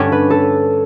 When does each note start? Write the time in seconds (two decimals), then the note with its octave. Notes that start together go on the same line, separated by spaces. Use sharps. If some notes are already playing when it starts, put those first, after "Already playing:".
Already playing: G2 D3 A3 C#4 G4 C#5
0.12 B4
0.30 A4